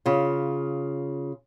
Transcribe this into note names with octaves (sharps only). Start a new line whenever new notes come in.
C#3 F4